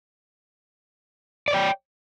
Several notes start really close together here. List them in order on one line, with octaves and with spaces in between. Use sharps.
D5 C#5 G5